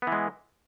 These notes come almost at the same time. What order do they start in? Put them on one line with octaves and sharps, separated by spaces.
B3 E3 G#3